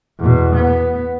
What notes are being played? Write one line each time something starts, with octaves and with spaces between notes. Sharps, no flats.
E2 B2
B3